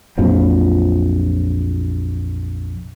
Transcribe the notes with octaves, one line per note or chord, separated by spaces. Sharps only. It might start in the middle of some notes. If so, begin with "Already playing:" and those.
A#1 F2 F3 F#3